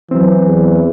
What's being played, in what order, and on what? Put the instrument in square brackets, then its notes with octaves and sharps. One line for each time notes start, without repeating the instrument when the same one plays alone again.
[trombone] E3 [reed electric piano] F#3 C4
[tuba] E2